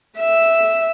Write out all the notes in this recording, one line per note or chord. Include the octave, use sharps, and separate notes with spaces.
E5